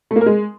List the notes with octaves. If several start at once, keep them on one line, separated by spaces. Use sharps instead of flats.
A3
A#3
A#4
G#3